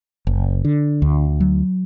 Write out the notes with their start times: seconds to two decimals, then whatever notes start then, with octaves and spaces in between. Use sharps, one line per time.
0.27 F#1
0.65 D3
1.02 D2
1.40 F#3